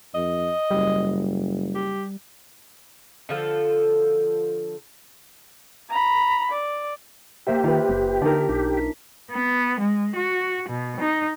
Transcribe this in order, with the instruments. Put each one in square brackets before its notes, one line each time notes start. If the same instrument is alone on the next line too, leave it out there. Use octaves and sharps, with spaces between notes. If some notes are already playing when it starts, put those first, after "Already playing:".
[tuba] F2 [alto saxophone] D#5
[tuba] F#1 [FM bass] G3
[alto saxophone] G4
[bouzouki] D3 F3 A4
[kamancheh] A#5 B5
D5
[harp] A#3 C5 E5 [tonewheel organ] G4
[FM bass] D#3 [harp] F4 B4
[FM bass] F#1
[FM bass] D3 [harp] D4 D#4 A#4
[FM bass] B1
[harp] B6
[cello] B3
G#3
F#4
B2
D#4